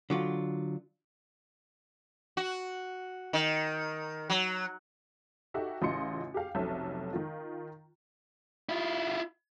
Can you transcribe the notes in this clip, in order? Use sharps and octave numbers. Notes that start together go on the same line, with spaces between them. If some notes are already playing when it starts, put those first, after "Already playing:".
D3 F#3 F4
F#4
D#3
F#3
D#4 F#4 G4 A4 E5
A1 C#3 F4 D#5 C6 C#7
G4 G#4 F5
F1 B1 C3 C#4 A4 E5
D#3 F4
E4 F4